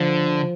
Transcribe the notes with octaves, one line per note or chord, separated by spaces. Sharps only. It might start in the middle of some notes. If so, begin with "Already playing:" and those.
Already playing: D3 F3